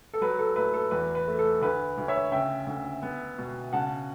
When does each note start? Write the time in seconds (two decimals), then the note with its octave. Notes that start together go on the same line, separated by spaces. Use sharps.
0.14 A4
0.21 F#3 B4
0.39 A4
0.56 A2 B4
0.74 A4
0.91 E2 B4
1.15 B4
1.27 A3
1.39 A4
1.61 D2 B4
1.98 D2
2.08 C#5 E5
2.32 C#3 E5 G5
2.67 D2
3.03 B3
3.38 B2
3.73 C#3 F#5 A5